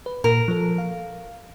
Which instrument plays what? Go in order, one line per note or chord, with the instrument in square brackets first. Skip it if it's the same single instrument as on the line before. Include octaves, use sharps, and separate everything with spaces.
[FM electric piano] B4
[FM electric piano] A#2 [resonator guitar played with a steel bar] A#4
[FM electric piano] F3 A4
F5